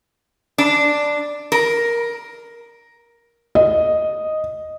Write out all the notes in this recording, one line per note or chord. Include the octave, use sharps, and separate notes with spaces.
D4
A#4
D#5